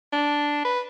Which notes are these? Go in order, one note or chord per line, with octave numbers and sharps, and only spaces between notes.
D4
B4